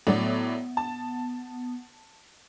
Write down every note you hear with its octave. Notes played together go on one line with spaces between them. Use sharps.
A2 F#3 B3 D5
A5